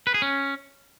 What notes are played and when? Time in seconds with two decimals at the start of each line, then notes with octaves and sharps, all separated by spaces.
0.07 B4
0.14 G#4
0.22 C#4